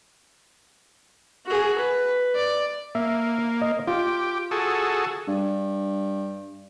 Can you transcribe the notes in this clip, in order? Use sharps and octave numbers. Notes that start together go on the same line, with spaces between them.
F#4 G#4
B4
D5
A#3 E5
D#5
F4 G4
F#4 G#4 A4
G2